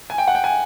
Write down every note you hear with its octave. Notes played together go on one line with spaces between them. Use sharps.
G#5
G5
F#5
G5
G#5